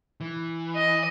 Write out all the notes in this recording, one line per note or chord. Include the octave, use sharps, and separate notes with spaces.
E3
D#5